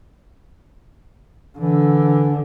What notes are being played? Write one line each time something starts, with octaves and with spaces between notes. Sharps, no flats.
D3 E3